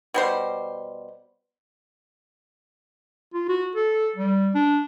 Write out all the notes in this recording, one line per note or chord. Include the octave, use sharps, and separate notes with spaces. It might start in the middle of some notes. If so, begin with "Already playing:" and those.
B2 G3 C5
F4
F#4
A4
G3
D4